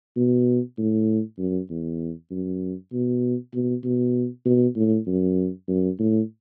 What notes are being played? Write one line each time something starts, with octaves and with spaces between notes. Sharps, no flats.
B2
A2
F#2
E2
F#2
B2
B2
B2
B2
A2
F#2
F#2
A2